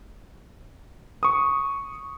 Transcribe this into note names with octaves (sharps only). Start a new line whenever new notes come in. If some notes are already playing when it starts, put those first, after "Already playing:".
C#6 D#6